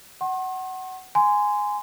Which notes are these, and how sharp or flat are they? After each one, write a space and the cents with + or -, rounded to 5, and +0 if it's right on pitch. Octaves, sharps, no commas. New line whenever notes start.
F#5 +20 C6 +45
G#5 +0 C6 -20